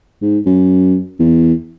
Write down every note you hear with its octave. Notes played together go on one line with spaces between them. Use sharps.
G#2
F#2
E2